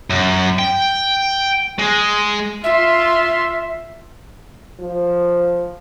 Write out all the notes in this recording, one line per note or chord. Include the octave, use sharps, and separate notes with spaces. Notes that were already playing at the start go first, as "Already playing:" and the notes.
F#2
G5
G#3
F4 E5 C6
F3